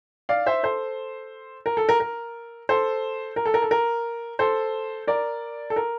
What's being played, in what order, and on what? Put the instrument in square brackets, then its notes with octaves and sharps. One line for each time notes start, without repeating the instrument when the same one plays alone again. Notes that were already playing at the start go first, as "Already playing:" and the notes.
[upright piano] D5 F5
C5 E5
A4 C5
A#4
A4
A#4
A#4
A4 C5
A#4
A4
A#4
A4
A#4
A4 C5
A#4 D5
A4
A#4